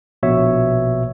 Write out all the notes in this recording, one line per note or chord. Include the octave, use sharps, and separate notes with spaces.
A#1 B2 C#5 E5